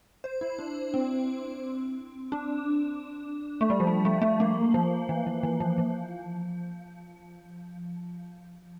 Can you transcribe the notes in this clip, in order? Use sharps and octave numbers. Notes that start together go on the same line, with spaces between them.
C5
E4
D4
C4
D4
A3
G3
F3
G3
A3
A3
A#3
F3
E3
F3
E3
F3
F3